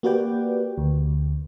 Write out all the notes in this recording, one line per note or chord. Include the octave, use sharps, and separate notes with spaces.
A#3 F#4 G4 B4 D5 G5
D2